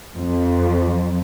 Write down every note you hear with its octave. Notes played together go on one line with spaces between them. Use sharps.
F2